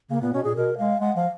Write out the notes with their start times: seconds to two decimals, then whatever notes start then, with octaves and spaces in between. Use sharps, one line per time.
0.10 C#3 A#3
0.21 A#2 B3
0.33 B2 C#4
0.44 A#2 G#4
0.55 B2 A#4
0.78 G#3 F5
1.00 G#3 F#5
1.16 F3 F5